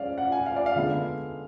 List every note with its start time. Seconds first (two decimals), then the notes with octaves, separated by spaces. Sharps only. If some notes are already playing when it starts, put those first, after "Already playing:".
Already playing: F3 G#3 C#4 D5 F5
0.18 F#5
0.32 G#5
0.46 F5
0.56 D5
0.66 F5
0.76 D3 G#3 B3